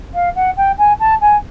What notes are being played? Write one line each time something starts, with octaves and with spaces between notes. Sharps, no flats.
F5
F#5
G5
G#5
A5
G#5